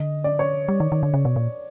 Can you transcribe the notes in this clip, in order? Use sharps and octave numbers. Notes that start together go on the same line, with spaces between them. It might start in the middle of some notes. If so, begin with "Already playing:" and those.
Already playing: D3 D#5
D5
C#5
G3
D#3
D#3
D3
C#3
B2
A#2